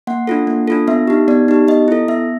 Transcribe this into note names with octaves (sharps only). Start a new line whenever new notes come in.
A#3 F#5
D4 F4 A4
A#3
D4 F4 A4
B3 E5
D#4 G4
B3 D5
D#4 G4
B3 D#5
E4 A4
B3 E5